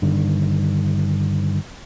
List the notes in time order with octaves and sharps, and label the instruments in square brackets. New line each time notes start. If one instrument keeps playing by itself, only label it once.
[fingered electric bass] G2 D3 D#3